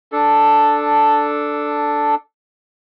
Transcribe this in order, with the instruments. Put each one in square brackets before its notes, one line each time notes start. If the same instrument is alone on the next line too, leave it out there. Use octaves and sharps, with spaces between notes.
[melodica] D4 A4